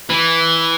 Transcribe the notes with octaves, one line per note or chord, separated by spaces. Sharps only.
E3